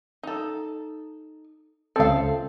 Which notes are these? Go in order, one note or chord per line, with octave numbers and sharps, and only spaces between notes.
D#4 A4
C#2 C4 A4 F5